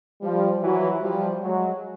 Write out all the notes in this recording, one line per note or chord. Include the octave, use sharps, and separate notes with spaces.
F3 G3
E3 F#3
F3 G3
F#3 G#3